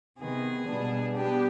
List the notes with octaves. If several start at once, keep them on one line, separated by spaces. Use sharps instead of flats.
C3 D#3 B3 G#4
B2 G3 B3 D4
G3 B3 D4 G4